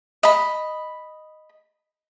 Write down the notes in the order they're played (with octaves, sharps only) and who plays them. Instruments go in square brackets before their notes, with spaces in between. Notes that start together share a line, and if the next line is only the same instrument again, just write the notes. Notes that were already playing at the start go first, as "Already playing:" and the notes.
[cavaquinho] D#5 B5